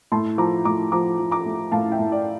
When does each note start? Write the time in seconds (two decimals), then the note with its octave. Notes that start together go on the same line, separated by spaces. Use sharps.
0.12 A2 A5 C6
0.38 F3 A#5 D6
0.65 A2 A#5 D6
0.92 F3 A#5 D6
1.19 F3
1.31 A#5 D6
1.46 A3
1.72 A2 F5 A5
1.92 E5 G5
1.99 A2
2.12 D5